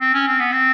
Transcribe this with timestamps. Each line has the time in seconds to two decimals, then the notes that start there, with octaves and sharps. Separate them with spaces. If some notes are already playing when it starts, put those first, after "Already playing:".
0.01 C4
0.14 C#4
0.28 C4
0.40 B3
0.52 C4